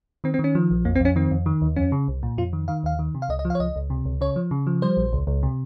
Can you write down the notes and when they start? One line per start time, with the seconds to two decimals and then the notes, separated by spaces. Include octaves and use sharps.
0.24 D#3 C4
0.34 C4
0.39 D#3
0.44 C#4
0.55 F3
0.71 A#1
0.85 F2 A#3
0.95 C4
1.00 F2 C#4
1.16 D#3 C4
1.31 F2
1.46 D#3
1.62 D#2
1.76 F2 C#4
1.92 C#3
2.08 C2
2.23 A#2
2.38 F2 F4
2.53 D#3
2.68 D#3 F5
2.84 D#2 F5
2.99 D#3
3.15 C3
3.22 F5
3.29 C#2 D#5
3.39 D#5
3.45 F3
3.50 F5
3.55 C#5
3.60 C#2 D#5
3.76 C#2
3.90 C3
4.05 C#2
4.21 C#3 C#5
4.36 F3
4.51 C#3
4.67 F3
4.82 G3 C5
4.97 A#1
5.13 C#2
5.27 C#2
5.43 C3